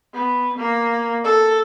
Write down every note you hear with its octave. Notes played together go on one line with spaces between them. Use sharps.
B3
A#3
A4